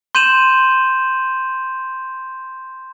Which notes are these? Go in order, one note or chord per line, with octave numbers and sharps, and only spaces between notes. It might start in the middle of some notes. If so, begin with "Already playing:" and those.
C6 G6 D#7 E7 F#7